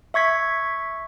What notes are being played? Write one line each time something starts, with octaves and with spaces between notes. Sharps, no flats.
E5 C#6 G#6 B6